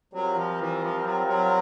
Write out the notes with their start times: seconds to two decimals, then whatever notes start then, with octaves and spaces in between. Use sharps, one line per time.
0.13 F#3 G3 C4 F4 A#4
0.36 F3
0.59 E3
0.81 F3
1.04 F#3
1.27 F#3